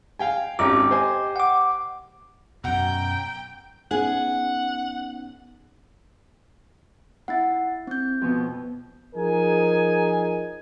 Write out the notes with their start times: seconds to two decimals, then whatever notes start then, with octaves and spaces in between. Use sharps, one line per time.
0.19 F5 G5 G#5
0.59 G#1 C#4 D#4 G4 D6
0.91 C5 D#5 G#5
1.36 F#5 D6
2.64 F#2 B2 F#5 G5 A#5
3.91 B3 C#4 D#4 G#4 F#5
7.28 E4 F#5 A6
7.87 C4 G6
8.22 F2 B2
9.15 F3 D#4 G#4 A#4 G#5